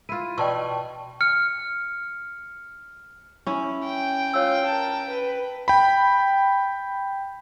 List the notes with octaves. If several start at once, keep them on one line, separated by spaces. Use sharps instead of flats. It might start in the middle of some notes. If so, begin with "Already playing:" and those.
E4 F4 D#7
B2 D5 G5 A5 C6 C#6 E6
F6 C#7
C#4 E4
G5
F4 C#5 E6
A#4 A5
B4
G5 B5